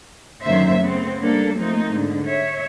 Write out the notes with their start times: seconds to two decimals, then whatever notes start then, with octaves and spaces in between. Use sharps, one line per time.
0.43 F#2 D3 D#3 A#3 C5 E5
0.79 C#3 A3 B3 C4
1.21 G3 A#3 D4 A4
1.57 F3 A3 A#3 C4 D#4
1.91 G#2 D3
2.27 C#5 E5